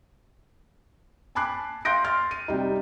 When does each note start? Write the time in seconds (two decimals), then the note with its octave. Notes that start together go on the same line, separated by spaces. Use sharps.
1.35 G#5 A5 B5 D6 F#6 C7
1.85 F5 C6 F#6 G6 A#6 D7
2.04 C6 F6 A6
2.31 D#7
2.48 C3 G3 D#4